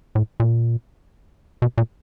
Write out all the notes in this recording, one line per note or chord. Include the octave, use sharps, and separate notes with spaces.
A2
A#2
B2
A#2